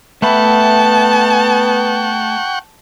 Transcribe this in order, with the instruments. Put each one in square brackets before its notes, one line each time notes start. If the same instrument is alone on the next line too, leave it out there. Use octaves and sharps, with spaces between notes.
[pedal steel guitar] A3 E5 B5 [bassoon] B3 [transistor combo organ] F#5 G5 C#6 [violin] A5